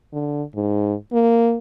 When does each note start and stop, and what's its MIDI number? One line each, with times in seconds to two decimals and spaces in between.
0.13 0.43 50
0.55 0.94 44
1.13 1.58 58